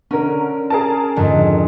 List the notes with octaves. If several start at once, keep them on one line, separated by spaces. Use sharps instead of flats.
D3 C#4 A#4
G#4 A#4 A5
F2 G#2 D3